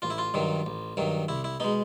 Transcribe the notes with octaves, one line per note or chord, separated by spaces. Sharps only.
A1 F4
E4
F4
G2 D#3 F#3
A1
G2 D#3 F#3
C2 E4
E4
B2 G#3 D#4